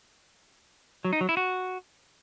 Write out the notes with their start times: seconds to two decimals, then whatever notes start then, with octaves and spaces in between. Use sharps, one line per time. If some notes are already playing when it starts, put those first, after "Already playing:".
1.05 F#3
1.13 D#4
1.21 F#3
1.29 E4
1.37 F#4